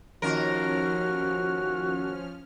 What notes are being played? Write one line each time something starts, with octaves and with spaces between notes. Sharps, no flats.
D#2 F3 C#4 F#4 A#4 F6